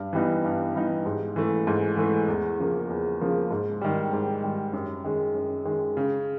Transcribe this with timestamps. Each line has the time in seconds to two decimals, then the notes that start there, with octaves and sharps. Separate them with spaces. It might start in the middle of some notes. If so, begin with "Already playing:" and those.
Already playing: G2
0.13 E3 G3 B3 D#4
0.44 G2
0.74 E3 G3 B3 D#4
1.06 G#2
1.36 E3 A3
1.67 G#2
1.97 E3 A3
2.28 E2
2.59 C#3 F3 A#3
2.90 E2
3.21 C#3 F3 A#3
3.51 G#2
3.81 D#3 G3
4.13 G#2
4.43 D#3 G3
4.73 F#2
5.04 D#3 G#3
5.35 F#2
5.65 D#3 G#3
5.97 C#3